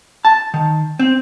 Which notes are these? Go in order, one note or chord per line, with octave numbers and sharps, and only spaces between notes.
A5
D#3
C4